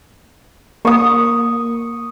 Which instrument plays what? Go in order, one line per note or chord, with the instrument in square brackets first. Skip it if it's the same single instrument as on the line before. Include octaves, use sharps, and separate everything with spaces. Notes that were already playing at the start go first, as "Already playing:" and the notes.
[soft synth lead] A#3 [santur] C#6 D#6